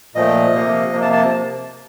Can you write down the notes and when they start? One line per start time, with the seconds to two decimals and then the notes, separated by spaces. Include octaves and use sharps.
0.15 A#2 F3 A3 D#5
0.54 C3 F3 A#3
0.93 C3 F3 A#3
1.02 A5
1.12 A5